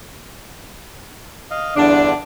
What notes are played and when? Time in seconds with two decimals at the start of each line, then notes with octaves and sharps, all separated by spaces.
1.51 D#5 F5
1.76 E2 G2 D3 D4